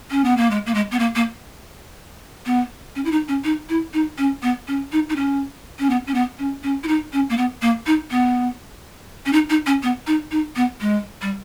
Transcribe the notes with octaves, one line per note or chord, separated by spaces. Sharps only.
C#4
B3
A#3
G#3
A#3
G#3
B3
A#3
A#3
B3
C#4
E4
D#4
C#4
D#4
E4
D#4
C#4
B3
C#4
D#4
D#4
C#4
C#4
B3
C#4
B3
C#4
C#4
E4
D#4
C#4
A#3
B3
A#3
D#4
B3
C#4
D#4
D#4
C#4
B3
D#4
D#4
B3
G#3
G3